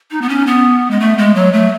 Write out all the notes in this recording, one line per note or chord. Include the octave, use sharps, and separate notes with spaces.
D#4
B3
C#4
B3
G#3
A3
G#3
F#3
A3